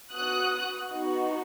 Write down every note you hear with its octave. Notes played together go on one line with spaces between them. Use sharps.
B3 F#4 D#6 F#6
B3 D#4 F#4